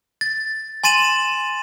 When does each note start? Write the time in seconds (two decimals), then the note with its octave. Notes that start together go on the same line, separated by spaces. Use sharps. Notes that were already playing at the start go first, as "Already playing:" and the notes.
0.21 A6
0.84 G#5 C6 A6 D#7 E7 F#7